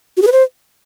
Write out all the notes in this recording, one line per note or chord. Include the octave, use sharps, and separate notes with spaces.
F#4
G#4
B4
C5